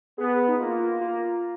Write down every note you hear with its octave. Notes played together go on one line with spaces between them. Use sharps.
B3 G#4
D#4
A#3 F4
F4